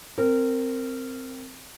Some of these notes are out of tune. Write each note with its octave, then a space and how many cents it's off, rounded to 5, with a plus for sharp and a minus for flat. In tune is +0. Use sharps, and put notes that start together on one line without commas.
C4 +0 A#4 -20